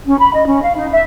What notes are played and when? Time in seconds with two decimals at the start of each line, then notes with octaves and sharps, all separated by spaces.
0.07 C#4
0.19 B5
0.33 D#5
0.46 C#4
0.62 F5
0.77 D#4
0.92 E5